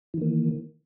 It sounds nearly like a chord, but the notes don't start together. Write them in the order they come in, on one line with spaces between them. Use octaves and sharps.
E3 D#3 A#3